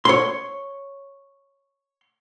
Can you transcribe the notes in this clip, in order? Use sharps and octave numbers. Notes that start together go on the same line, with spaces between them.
C#5 C6